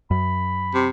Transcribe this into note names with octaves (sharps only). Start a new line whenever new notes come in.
F#2 B5
C3